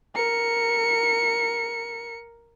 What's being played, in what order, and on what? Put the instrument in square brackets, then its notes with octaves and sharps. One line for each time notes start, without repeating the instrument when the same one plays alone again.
[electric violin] A#4 C#7